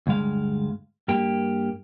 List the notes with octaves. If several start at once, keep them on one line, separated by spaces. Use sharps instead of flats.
D2 G2 G#3 F5
G2 A#3 G4